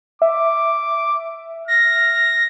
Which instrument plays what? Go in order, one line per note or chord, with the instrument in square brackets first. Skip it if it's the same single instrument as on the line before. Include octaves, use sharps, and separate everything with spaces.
[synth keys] E5 [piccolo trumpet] D6
[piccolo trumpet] F6 [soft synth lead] A#6